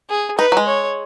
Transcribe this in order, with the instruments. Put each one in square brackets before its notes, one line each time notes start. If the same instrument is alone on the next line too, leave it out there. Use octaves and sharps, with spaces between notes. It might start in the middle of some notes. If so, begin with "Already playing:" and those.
[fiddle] G#4
[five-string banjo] D#4 [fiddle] B4
[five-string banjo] F#3
G#3
[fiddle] C#5